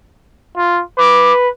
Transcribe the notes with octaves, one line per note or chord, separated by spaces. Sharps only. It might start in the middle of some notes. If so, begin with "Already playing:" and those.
F4
B4 D6